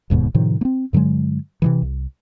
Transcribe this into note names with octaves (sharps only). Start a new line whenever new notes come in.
E1 D#2 G#2 B2
A2 C3 D#3 F3
A#3 C4
G2 D3 F#3 G#3
C3 D#3 E3
C2